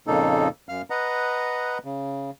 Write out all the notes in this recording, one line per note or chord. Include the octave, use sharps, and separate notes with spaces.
F2 A#2 C#3 A#3 D#4 A4
F#2 F5 F6
B4 D#5 F#5 A#5
C#3